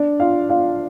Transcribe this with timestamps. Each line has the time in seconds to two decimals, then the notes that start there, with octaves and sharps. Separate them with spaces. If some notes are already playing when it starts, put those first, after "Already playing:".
Already playing: D4 D5
0.20 F4 F5
0.50 F4 F5